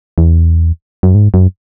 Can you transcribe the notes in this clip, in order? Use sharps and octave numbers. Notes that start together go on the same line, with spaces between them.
E2
F#2
G#2
F#2